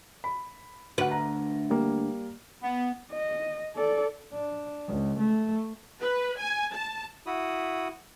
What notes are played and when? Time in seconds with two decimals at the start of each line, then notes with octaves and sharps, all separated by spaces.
0.24 B5
0.98 D2 F#4 B4 F#5
1.11 A#5
1.70 G3 A#3
2.62 B3
3.11 D#5
3.76 A4 D5
4.34 D4
4.88 C#2
5.19 A3
6.01 B4
6.38 G#5
6.74 A5
7.26 E4 F#4 B5 D#6